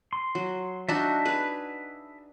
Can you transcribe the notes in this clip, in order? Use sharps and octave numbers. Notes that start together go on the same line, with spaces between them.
C6
F#3
D4 D#4 F#4 E5 A5
G#4 B4